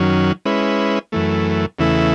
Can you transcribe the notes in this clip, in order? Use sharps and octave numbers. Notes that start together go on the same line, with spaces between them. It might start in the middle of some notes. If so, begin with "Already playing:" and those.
Already playing: F#2 D#3 F#3 C#4
G#3 C#4 E4 B4
F#2 E3 A3
E2 C#3 E3 A3 E4